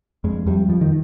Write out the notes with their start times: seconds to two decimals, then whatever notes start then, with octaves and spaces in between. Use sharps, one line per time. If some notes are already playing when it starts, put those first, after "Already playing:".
0.24 F2 G#3
0.47 F2 G3
0.69 F2 F3
0.81 D#3